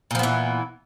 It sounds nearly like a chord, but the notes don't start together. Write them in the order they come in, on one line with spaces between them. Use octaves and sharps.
A#2 F3 B3 E3